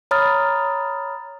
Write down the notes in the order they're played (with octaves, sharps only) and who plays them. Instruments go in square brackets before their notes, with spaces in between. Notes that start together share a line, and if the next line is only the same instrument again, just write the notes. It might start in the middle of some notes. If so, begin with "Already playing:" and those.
[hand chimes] C#5 A#5 B5 D#6 F6 A6